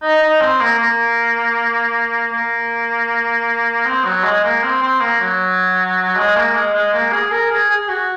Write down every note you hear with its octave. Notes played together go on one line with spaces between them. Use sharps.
D#4
D#4
C4
A#3
A#3
A#3
C4
F#3
G#3
A#3
C4
C4
A#3
F#3
G#3
A#3
G#3
G#3
A#3
G#4
A#4
G#4
G#4
F#4